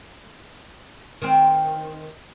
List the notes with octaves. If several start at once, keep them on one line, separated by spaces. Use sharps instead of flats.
D#3 C4